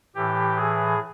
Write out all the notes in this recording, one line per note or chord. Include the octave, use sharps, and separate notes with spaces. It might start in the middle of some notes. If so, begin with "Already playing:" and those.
A2 E3 G4
G#4